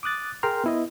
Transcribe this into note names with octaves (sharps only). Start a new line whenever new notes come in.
D6 D#6 F#6 A6
G#4 A#4 G5 A#5 C6 F6
B3 E4 D#5